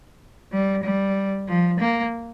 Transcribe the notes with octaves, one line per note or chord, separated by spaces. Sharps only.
G3
G3
F3
A#3